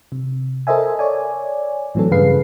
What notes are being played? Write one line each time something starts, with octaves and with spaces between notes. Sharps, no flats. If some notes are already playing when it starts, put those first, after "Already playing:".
C3
A4 A#4 C5 D#5 E5 G#5
C#5 D5 G#5
A2 E3 F#3 C4 A4
G2 C#3 G#4 B4 F5 C7